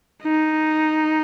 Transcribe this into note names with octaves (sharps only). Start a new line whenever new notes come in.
D#4